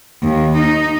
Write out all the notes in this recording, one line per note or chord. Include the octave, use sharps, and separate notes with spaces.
D#2
D#4